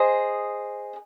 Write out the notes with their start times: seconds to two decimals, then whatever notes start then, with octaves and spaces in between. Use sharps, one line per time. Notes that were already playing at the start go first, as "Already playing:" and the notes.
Already playing: G#4 C5 D#5